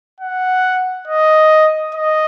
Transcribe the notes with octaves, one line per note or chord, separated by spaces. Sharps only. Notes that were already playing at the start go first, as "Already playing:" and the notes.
F#5
D#5
D#5